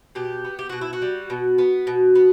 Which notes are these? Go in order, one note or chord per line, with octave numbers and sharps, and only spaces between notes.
B2 G4
B3
G4
B2 F#4
E4
F#4
G3
B2
B3
B2
B3